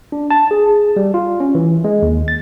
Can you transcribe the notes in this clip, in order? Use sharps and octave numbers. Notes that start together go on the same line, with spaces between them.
D4
A5
G#4
G3
F4
C#4
E3
G#3
D#2
A6